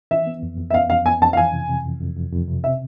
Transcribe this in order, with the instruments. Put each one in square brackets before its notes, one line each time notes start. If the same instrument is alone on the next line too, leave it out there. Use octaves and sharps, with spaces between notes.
[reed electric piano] E3 [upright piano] E5
[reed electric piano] B3
F2
F2
[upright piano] E5
[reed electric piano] B3 [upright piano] F5
[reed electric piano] F2 [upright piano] F5
[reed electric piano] B3 [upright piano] G#5
[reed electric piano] F2 [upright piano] A5
[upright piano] F5
[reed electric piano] E3 [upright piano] G#5
[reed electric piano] C3
C3
F2
F2
F2
F2
C3
[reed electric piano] C3 [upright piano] E5